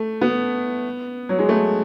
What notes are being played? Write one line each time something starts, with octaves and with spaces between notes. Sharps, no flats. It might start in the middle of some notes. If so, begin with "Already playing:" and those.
Already playing: A3
B3
F#3
G#3
A3